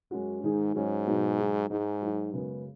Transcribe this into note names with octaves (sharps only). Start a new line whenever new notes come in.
F#2 G#3 C#4 F#4
G#2 D#3 G#3 D#4 G#4
G#2 F#3 C#4 G#4
B2 F#3 D#4 G#4
F#3 D#4 G#4
G#2 G#3 D#4 G#4
F#3 D#4 F#4
F#2 C#3 G#3 B3